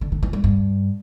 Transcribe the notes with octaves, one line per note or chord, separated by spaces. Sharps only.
D3
D3
E3
G3
G2